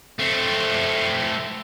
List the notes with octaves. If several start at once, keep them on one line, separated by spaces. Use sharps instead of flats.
A3 C4